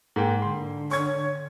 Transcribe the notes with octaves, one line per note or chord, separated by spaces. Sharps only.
G#2 A#3 G5
D3 C6
C#5 C#6 G#6